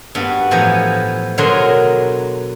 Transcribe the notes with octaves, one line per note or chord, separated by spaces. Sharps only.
G2 B3 F#4
A2 E3 F3 B3 G#5 A#5
B2 D3 F#3 G#4 A#4 C6